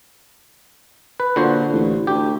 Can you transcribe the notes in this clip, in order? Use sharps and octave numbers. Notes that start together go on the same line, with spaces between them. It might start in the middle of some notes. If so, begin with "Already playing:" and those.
B4
A#2 D3 F#4 C5
A1
D2 G4